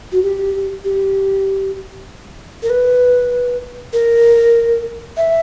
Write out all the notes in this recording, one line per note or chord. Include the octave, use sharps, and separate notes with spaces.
F#4
G4
G4
A#4
B4
A#4
E5